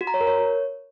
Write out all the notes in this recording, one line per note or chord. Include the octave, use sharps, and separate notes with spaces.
F#4
A#5
C#5
A#4
C#5